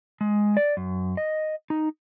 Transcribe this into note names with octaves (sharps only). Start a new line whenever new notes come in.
G#3
D5
F#2
D#5
D#4